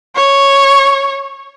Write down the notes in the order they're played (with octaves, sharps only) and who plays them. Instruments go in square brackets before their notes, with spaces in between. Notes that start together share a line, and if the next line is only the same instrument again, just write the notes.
[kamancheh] C#5